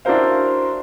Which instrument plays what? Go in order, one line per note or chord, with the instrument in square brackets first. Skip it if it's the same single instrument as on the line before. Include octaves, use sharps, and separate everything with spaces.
[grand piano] D4 E4 F#4 A#4 C5 F5